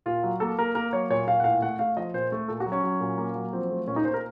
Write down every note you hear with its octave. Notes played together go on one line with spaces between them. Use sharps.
A#2 F4
F#3
A#3 A4
A#3 A#4
A#3 A#4
F#3 C#5
A#2 C#5
A#2 F5
F#5
A2 F5
A3 F#5
A3 F5
F3 D#5
A#2 C5
A3
A#2 A4
F#4
F#3
C#4
F#3
A#2
A#3
F#3
F3 C4
A3
A#2 C#4
D#4
A#2 C5
A#4